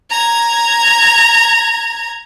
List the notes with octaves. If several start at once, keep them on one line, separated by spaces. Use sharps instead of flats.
A#5 G#6